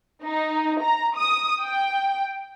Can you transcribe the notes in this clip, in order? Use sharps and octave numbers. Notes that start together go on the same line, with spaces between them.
D#4
A#5
D#6
G5